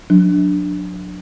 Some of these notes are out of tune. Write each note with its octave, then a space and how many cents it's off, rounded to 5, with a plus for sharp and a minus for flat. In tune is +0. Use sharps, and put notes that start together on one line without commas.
F#3 -30 D4 +0